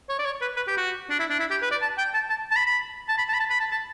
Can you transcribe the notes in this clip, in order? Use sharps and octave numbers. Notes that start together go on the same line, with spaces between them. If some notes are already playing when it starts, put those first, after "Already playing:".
C#5
D5
C#5
B4
B4
G4
F#4
D4
E4
D4
E4
G4
B4
D5
A5
G5
A5
A5
A5
B5
B5
A5
B5
A5
B5
A5
B5
A5
A5